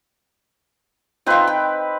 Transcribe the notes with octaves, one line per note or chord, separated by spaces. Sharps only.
C4 D#4 F4 B4 F5
G5